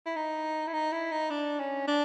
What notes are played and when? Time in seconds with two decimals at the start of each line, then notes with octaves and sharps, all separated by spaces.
0.06 E4
0.16 D#4
0.67 E4
0.74 D#4
0.92 E4
1.12 D#4
1.30 D4
1.60 C#4
1.88 D4